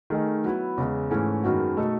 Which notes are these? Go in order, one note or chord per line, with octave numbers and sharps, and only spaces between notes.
D#3 A3 D#4 G#4
F#3 B3 E4
E2 C#3 G#3
G#2 E3 A3 C#4 G#4
F#2 D#3 G#3 B3 F#4
B2 A3 D#4 A4